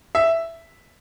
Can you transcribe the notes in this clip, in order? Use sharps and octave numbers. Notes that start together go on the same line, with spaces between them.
E5